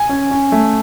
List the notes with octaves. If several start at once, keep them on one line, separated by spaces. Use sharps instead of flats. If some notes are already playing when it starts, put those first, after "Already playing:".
Already playing: G#5
C#4
C#4
A3